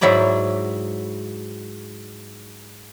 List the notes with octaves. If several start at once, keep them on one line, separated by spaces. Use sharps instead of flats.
G#2 F#3 E4 D5 A#5